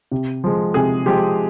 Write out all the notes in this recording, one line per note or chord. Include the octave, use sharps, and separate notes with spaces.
C3
F3 G#3
C3 G#4
F3 G#3 G4